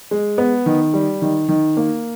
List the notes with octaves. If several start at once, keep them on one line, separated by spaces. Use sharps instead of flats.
G#3
B3
D#3
G3
D#3
D#3
A#3